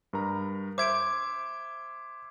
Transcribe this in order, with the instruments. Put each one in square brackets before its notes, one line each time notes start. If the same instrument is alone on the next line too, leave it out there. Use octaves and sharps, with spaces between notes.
[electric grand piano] G2 A#4 A#5
[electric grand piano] C5 E5 [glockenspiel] D6 G#6 D7